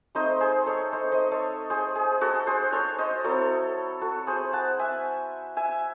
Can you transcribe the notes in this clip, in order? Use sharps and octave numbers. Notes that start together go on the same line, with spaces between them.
A3 C4 D#4 C5 D#5
G#4 C5
A4 C#5
C5 D#5
C5 D#5
A4 C#5
G#4 C5
G#4
F#4 A4
G#4 C5
A4 C#5
C5 D#5
F#3 C4 E4 A4 C#5
F#4 A4
G#4 C5
F#5 A5
E5 G#5
E5 G#5